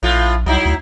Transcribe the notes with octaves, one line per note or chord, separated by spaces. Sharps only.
A#1 A2 F4
C2 F#3 D#4 E4
D2